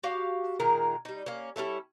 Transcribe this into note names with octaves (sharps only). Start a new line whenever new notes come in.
F#4 G4 F5
A#2 D#3 G#3 A#4
G3 D#4
A#3 C#4
G3 C#4 E4 A4